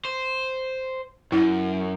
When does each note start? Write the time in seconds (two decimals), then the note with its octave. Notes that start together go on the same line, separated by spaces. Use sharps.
0.05 C5
1.32 F#2 E4